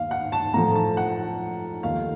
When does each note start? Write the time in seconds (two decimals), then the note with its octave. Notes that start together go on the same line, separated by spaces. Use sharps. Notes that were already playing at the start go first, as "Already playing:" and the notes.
Already playing: D#2 D#3 F5
0.11 F#5
0.32 A5
0.54 A2 F3 A3 A#5
0.75 A5
0.97 F#5
1.83 D#2 D#3 A3 F5